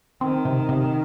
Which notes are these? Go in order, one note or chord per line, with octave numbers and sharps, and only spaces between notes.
D#3 C4
C3
C3